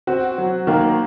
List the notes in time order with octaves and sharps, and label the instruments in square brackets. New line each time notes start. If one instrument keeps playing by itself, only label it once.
[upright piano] C4 [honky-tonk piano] F#4
[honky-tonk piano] F#3
[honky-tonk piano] D#3 [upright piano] A#3